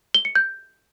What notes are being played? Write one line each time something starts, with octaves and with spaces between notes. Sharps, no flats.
G7
C#7
G6